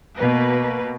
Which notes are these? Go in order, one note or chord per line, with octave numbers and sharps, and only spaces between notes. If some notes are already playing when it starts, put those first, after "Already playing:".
B2 A#3 B4